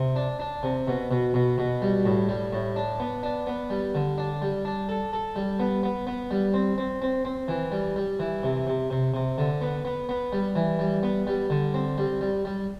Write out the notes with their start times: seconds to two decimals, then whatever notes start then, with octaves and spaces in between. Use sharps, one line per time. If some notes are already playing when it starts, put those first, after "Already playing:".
Already playing: C3
0.16 D4
0.39 D4
0.63 C3
0.87 B2
1.11 B2
1.34 B2
1.58 B2
1.82 G3
2.06 A2
2.29 G3
2.53 A2
2.76 D4
3.00 B3
3.23 D4
3.47 B3
3.70 G3
3.95 D3
4.18 D4
4.42 G3
4.65 D4
4.89 A4
5.13 A4
5.36 G3
5.60 B3
5.83 B3
6.07 B3
6.31 G3
6.54 C4
6.78 C4
7.02 C4
7.25 C4
7.48 E3
7.72 G3
7.96 G3
8.20 E3
8.43 C3
8.67 C3
8.90 C3
9.14 C3
9.38 D3
9.61 B3
9.85 B3
10.09 B3
10.33 G3
10.55 E3
10.79 G3
11.03 B3
11.27 G3
11.50 D3
11.74 C4
11.98 G3
12.21 G3
12.45 G3